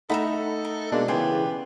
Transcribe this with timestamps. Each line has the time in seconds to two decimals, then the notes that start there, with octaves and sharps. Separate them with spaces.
0.10 A3 D#4 A4 E5 F#5 A#5 B5
0.65 A#4
0.92 B2 G#3 A#3 D4
1.08 C#3 E3 B3 G4 C5 G#5